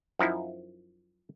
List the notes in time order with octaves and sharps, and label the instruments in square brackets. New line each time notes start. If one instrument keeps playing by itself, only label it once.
[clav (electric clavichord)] F#2 F3 D#4 E4